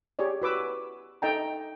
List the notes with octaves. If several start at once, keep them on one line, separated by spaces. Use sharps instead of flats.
G4 G#4 C#5 D5
F#4 B4 D6 E6
D#4 A4 D#5 G5 A5 A#5